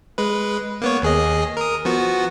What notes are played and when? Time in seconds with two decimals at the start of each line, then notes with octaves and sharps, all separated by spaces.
0.18 G#3 B4
0.81 A#3 B3 C#5
1.02 D#2 G#4 D#5
1.57 A#4 D#6
1.85 F3 B3 F#4